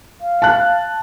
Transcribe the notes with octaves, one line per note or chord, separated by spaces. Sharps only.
F5
A5 F#6